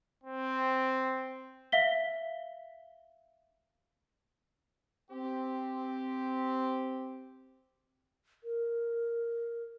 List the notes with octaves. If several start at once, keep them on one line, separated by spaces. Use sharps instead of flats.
C4
E5 F5 B6 G7
C4 G4
A#4